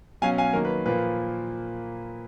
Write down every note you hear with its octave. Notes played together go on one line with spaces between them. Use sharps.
B2 F#3 C#4 F5 G#5
F5 G#5
D#3 F#3 A#3 A#4
B4
A#2 F3 A#3 B4